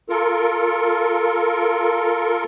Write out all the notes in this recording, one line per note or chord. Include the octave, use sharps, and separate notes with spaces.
F4 A4 A#4